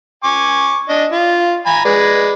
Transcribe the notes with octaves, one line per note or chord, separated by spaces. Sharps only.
G#5 C#6 D6
D4 D#5
F4
G#5 A#5 B5
G#3 B4 D5